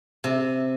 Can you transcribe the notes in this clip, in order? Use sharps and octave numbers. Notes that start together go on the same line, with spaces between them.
C3